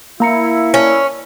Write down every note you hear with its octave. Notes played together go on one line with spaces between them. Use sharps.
A#3 E4 A#5 C#7
C#4